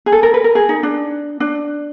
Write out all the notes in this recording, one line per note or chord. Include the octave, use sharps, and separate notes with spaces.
G#4
A4
A#4
B4
A#4
G#4
D#4
D4
D4